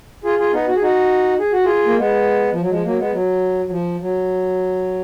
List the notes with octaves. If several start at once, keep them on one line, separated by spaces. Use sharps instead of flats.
F4 G#4
F4 G#4
B3 D#4
F#4
G#4
D#4 F#4
G#4
F#4
F4 G#4
A#3
G#3 B3
F3
F#3
F3 G#3
F#3 A#3
G#3 B3
F#3
F#3
F3
F#3